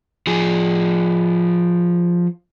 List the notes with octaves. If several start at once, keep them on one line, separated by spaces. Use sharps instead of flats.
F3 G#4